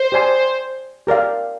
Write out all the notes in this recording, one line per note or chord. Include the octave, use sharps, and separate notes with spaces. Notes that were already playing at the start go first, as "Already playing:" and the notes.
Already playing: C5
G4 D5 G#5 C6
G4 A#4 D5 F5